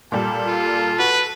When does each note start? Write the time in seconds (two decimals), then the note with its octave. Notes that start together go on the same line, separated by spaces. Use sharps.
0.12 A#2 G3 A4
0.47 F4
0.99 F#4 B4